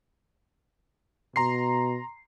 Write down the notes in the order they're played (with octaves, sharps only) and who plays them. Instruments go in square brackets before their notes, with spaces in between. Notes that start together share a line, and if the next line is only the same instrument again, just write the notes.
[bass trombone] B2 [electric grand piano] A#5 C6 C7